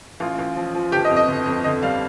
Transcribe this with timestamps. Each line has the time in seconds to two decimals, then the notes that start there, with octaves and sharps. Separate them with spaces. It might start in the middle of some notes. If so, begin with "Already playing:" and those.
0.20 A1 F4
0.39 A1
0.56 F3
0.75 F3
0.92 G1 G4
1.05 D#5
1.10 F2
1.17 D#5
1.28 G1
1.46 F2
1.64 D3 D#5
1.82 G3 F5